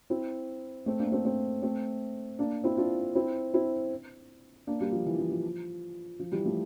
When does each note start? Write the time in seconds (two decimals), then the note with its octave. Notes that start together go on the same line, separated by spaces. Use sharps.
0.10 C4 E4
0.86 A3 C4
0.99 A#3 D4
1.12 A3 C4
1.24 A3 C4
1.63 A3 C4
2.39 A#3 D4
2.64 C4 E4
2.77 D4 F4
3.15 C4 E4
3.54 C4 E4
4.67 A#3 D4
4.81 G3 A#3
4.92 F3
5.06 E3
5.18 F3
5.31 F3
6.19 F3
6.32 E3 G3
6.45 F3 A3